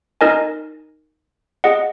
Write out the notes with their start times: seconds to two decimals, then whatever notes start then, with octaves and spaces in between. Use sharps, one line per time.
0.21 D#4 A#4 D#5 G#5
1.64 G#4 D#5 F#5